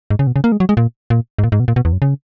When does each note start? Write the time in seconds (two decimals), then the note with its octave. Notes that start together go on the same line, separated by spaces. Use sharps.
0.10 G#2
0.19 C#3
0.27 B2
0.36 C#3
0.44 A#3
0.52 G#3
0.60 F#3
0.69 G#3
0.77 A#2
1.10 A#2
1.39 G#2
1.44 A#2
1.52 G#2
1.60 B2
1.68 A#2
1.76 B2
1.85 E2
1.93 F#2
2.02 C#3